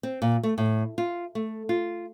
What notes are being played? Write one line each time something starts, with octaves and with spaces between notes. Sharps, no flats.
C4
A#2
A3
A2
F4
A3
F4